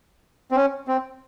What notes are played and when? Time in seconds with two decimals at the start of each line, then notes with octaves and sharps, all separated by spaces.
0.51 C4
0.56 C#4
0.88 C4